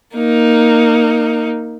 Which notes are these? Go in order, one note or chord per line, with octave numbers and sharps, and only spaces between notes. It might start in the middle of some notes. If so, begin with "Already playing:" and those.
A#3 D#4